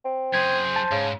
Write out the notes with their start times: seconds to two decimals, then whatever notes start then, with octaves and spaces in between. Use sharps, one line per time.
0.05 C4
0.34 F#2 G#4 C5 G#6
0.76 A5
0.91 G#2 C#3